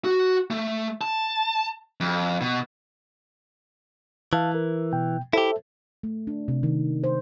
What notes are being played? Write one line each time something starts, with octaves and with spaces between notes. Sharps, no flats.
F#4
A3
A5
F2
B2
E3 F5 A5
A#4
B2 G5
E4 G4 A4 C5 E5
A3
D4
C3
D#3
C5